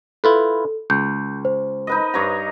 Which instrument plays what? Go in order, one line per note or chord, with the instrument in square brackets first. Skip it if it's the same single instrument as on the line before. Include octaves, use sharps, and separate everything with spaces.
[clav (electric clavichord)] E4 F4 B4 [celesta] A4
[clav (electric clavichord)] C#2 [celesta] G6
[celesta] C5
[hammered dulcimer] D#4 B4 D#5
G2 C#5 A#5